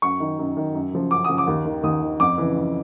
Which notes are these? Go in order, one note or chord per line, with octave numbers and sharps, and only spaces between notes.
F#2 C#6
D#3
F#2
D#3
F#2
C#3 F3
F#2 D6
C#3 F3 D#6
D6
D#2
D#3
D#2 D#6
D#3
F2 D6
C#3 E3
F2